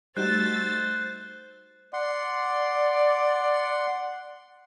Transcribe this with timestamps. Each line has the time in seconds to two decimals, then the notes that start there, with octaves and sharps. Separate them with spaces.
0.17 G3 A3 D#4 F#4 C5 E6 F#6 A6
1.93 D5 F#5 C6